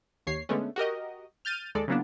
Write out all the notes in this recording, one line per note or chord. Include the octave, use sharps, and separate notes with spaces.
D#2 C#5 C7
D3 G#3 A3 B3 C#4
F#4 G4 A#4 D#5
F6 G6 A6 D#7
D#2 G#3 A4 D5
C#3 E3 F#3 A#3 B3 D4